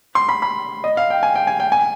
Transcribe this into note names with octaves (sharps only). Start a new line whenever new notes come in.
C6
B5
B5
D#5
F5
G5
G#5
G5
G#5
G5
G#5